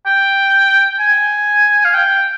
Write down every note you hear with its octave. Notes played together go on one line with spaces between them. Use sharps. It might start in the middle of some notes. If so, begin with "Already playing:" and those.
G5
G#5
F5
G5